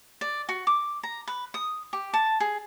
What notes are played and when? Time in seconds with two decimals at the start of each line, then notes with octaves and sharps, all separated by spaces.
0.21 D5
0.49 F#4
0.67 D6
1.03 A#5
1.28 B4
1.54 D#6
1.93 G4
2.13 A5
2.40 G#4